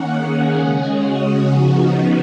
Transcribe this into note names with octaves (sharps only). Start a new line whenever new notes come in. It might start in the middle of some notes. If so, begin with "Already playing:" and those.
Already playing: D#3 A#3 C#4 F#5
G#4
C#3 G#3 C#4
F#4
C#3 F3 B3 D#4 F#4